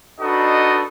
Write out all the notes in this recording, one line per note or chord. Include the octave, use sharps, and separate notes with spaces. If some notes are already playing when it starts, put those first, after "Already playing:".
D4 D#4 F#4 A4 B4 D#5